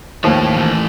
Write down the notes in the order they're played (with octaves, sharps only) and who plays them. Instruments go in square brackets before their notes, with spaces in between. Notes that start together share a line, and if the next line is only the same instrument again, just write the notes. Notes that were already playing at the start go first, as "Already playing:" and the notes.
[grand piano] D#2 F3 [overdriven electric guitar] A3 C#5
[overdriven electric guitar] E3 A3